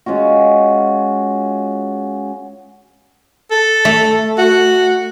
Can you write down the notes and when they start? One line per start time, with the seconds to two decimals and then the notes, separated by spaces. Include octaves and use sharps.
0.06 G#3 C#4 F4 F#4
3.51 A4
3.85 A3
4.38 F#4